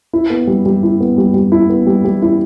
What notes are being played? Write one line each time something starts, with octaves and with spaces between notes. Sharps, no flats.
E4
B3
G3
G3
E4
B3
G3
G3
E4
B3
G3
G3
E4